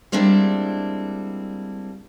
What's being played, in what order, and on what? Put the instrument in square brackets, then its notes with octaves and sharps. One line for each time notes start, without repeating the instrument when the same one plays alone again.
[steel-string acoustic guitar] G3 G#3 A#3 C4 D4 E4